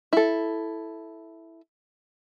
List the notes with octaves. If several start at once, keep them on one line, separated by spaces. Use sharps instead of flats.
E4 A4